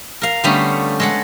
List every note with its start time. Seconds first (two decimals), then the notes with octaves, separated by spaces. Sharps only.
0.22 A#4 F5
0.44 D3 G3 A3 B3 C#4
1.00 G#3 A4 F#5